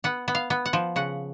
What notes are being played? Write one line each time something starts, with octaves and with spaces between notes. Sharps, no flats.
B3 F#5
B3
F5
B3
F#5
F3
C#3 F#5